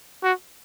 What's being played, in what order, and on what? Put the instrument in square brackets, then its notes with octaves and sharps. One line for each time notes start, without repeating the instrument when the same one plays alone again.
[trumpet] F#4